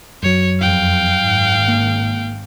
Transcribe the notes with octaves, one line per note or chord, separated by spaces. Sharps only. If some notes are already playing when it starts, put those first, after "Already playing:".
F#2 F#3 C#5
F2 F5 G5
G#1
A#3